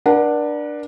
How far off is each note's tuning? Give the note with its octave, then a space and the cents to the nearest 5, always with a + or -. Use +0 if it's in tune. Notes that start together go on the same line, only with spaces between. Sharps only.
D4 +10 A#4 +45 F#5 +0